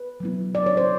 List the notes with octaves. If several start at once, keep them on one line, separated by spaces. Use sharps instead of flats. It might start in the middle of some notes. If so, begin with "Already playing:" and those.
Already playing: B4
F#3 B3 E4
D5
C#5
C5